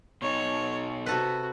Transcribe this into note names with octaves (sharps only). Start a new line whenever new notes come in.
B2 D#4 C#5
C3 F#4 A4 B4